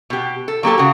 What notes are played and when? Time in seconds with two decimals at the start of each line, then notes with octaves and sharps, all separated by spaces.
0.10 B2 G4
0.48 A4
0.63 F#3 A#3 G4 A4
0.78 C#3 F#4